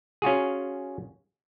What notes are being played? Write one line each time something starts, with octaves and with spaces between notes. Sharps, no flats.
C#4 F4 F#4 G#4